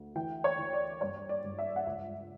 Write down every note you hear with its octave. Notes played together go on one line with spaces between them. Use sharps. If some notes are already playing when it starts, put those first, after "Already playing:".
Already playing: D2
E3 G5
C#5
E3
D5
G2 C#5
D5
G2
E5
F#5
C#2 E5